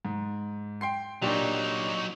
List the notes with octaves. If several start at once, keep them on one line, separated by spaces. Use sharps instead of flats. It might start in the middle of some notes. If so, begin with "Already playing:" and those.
G#2
G5 C6 C7
A#2 F#3 D4 D#4 G4